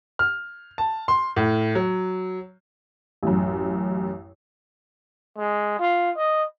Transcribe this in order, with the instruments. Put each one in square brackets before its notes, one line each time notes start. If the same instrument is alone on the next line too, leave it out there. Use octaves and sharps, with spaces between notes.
[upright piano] F6
A5
C6
A2
F#3
[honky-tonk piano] A1 F#2
[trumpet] G#3
F4
D#5